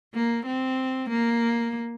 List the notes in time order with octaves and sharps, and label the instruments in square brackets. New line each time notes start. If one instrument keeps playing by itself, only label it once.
[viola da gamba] A#3
C4
A#3